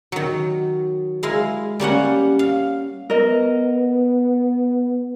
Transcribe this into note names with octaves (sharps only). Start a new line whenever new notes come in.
D#3 F#3
G#3 E4 A#4 F5
G3 A#3 C#4 F#5
F5
B3 A#4 D#5